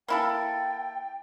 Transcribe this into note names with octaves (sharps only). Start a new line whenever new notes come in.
A#3 E4 A4 G5